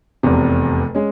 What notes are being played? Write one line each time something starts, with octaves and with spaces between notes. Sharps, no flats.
F1 E2 C3
G#3 C#4